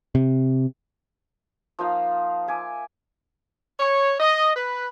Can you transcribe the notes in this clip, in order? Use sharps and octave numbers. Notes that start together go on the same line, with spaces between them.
C3
F3 A#3 D#4 F5
E5 G#5 D6
C#5
D#5
B4